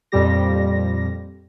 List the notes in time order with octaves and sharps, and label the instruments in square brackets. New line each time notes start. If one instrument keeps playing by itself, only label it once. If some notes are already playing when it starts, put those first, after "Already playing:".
[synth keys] F2 A#2 G3 G4 A#6